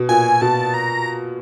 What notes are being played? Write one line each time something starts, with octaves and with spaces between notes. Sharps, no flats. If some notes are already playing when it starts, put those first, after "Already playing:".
Already playing: B2
A#2 G#5
B2 A5
A#5